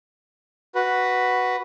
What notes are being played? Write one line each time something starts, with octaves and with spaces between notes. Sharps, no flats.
F#4 B4